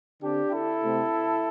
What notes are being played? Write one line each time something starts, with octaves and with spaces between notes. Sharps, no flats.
D3 C4 D4 G4
E4 A4
C3 A3 C4